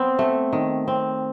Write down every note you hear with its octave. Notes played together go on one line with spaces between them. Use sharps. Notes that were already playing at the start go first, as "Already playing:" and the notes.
Already playing: B3 C4
A3
D#3
C4